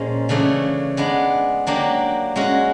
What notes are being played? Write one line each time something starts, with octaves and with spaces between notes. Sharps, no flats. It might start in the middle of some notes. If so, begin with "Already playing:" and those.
Already playing: A#2 F3 G#3 C#4
C#3 E3 A3 D4
G#3 B3 D4
F#3 A#3 D4 G4
G#3 C#4 F#4